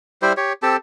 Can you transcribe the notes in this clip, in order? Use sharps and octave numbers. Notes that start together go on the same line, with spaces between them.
G3 E4 G4 C5
G4 C#5
C4 G4 A4 A5